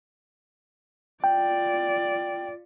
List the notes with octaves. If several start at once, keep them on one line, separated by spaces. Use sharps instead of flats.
F4 D5 G5